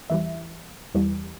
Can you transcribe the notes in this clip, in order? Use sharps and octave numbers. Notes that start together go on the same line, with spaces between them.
E2 E3 G3 E5
E2 E3 G3